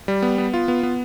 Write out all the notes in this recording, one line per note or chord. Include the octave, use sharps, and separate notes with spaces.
G3
B3
B3
F4
B3
B3